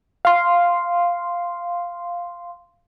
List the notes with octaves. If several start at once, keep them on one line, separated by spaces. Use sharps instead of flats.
F5 C6